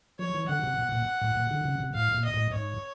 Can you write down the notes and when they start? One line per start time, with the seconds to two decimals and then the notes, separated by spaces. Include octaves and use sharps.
0.19 F3 C#5
0.35 E3
0.49 D3 F#5
0.64 C3
0.79 B2
0.92 A#2
1.22 A2
1.37 A#2
1.51 D3
1.65 C#3
1.80 C3
1.94 A2 F5
2.15 A#2
2.24 D#5
2.34 A2
2.54 G#2 C#5